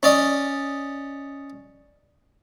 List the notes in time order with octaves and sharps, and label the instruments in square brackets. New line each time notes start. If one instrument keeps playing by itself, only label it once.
[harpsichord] C#4 D5 D#5